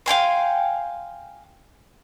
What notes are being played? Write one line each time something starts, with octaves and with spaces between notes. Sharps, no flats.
F5 G5 G#5 C6